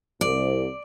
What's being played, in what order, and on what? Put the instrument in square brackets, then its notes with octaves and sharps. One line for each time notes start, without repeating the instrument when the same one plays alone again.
[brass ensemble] C2 [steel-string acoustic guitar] D5